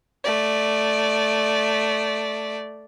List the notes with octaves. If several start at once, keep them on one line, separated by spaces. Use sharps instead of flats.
A3 D5